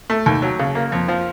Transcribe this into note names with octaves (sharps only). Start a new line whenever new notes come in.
A3
D#2
F#3
C#3
A#3
F2
F3